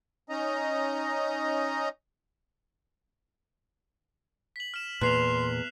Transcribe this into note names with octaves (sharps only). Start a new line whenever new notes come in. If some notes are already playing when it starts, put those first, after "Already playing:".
C#4 D#4 D#5 A#5
B6 F#7
F6 E7
E2 A#2 A#3 C6 F#6 C7 F7